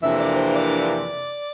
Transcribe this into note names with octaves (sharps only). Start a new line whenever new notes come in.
F2 C3 E3 A#3 D4 E5
D5
C5
D5